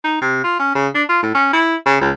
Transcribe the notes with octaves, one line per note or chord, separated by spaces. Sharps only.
D#4
C3
F4
C#4
C#3
D4
F4
A2
C#4
E4
C#3
C#2